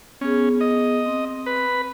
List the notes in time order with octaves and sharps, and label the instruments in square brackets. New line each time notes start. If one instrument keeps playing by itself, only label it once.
[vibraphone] B3 G#4 [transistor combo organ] C#4
[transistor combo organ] D#5
[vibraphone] C4
[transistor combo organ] B4